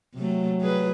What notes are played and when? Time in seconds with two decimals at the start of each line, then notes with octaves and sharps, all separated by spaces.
0.15 C3 F#3 A3
0.59 G3 G#4 B4